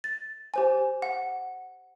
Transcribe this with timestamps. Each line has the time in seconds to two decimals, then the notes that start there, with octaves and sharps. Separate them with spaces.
0.04 A6
0.54 G4 C5 G#5
1.02 F#5